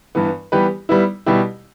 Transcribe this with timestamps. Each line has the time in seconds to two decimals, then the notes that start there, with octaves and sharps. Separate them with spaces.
0.15 G2 E3 B3
0.52 E3 G3 B3 G4 B4
0.89 G3 B3 E4
1.26 B2 G3 E4 G4